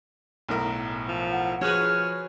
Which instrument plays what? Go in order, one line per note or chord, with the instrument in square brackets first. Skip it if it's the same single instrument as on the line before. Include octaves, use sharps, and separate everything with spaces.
[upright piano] B1 A2 A#4
[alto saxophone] F3
[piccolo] F#5
[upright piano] F3 [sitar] F#4 G#4 B4 [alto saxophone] C#5 [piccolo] F6